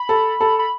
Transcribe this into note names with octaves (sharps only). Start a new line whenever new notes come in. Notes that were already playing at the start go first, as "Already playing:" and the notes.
Already playing: B5
A4
A4
B5